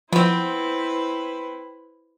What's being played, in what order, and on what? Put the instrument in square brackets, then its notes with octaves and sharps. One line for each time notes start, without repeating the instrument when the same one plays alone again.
[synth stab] F3 D7 [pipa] B3 C4 [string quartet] E4 B4 C5